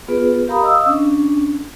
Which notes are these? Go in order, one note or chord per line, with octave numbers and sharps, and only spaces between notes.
B3 F4 G#4 B4
G4 A#4 F5 A#5 B5 D#6
D#5 F5 D#6 E6
C#4 D4